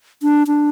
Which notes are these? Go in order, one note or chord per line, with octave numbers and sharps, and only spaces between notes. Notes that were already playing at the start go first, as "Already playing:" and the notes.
D4
D4